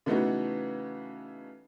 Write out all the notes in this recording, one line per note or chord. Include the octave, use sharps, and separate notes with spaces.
C#3 E3 A3 B3 D#4 F#4